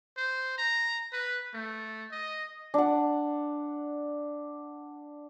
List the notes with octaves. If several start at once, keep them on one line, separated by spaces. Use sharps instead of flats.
C5
A#5
B4
A3
D#5
D4 F#5